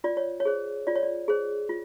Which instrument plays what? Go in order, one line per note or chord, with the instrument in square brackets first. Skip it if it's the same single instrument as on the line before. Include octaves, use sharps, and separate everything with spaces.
[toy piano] F4 D5
C#5
C#5
G#4 C5
F4 D5
C#5
D5
G#4 C5
F4